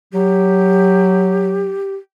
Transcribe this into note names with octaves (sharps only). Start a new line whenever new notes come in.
F#3 G4